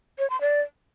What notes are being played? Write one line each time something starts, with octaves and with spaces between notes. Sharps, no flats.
C#5
C6
D5